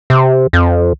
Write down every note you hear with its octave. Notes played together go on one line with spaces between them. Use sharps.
C3
F2